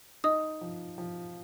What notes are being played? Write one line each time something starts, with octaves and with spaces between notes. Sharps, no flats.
D#4 D#5 D#6
F3
F3